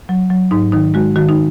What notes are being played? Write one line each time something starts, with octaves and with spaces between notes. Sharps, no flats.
F#3
F#3
G#2 D#4
D#3 D#4
G#3 F#4
D#3 F#4
D#4